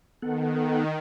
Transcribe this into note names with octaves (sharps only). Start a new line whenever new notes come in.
D#3 B3 A4 F#5